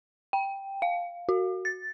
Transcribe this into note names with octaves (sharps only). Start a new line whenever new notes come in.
G5
F5
F#4
A6